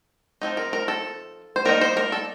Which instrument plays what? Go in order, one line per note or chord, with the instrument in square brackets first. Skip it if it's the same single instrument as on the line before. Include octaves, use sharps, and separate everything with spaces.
[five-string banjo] F3 C4 D#4
A#4
A#4
A4
C5
G3 A#3 D#4 A#4
C5
A#4
A4